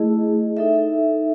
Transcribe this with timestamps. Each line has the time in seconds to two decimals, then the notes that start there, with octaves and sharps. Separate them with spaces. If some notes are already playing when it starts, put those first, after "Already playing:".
Already playing: A3 E4 G#4 D#5
0.57 D#4 A4 E5